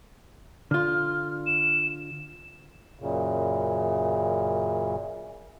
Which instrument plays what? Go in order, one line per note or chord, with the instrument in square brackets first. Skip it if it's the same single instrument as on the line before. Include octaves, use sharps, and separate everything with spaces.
[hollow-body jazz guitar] D3 F4 [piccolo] F6
[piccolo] E7
[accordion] F#2 A#2 C#3